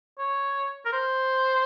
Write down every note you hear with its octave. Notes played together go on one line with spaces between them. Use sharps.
C#5
A#4
C5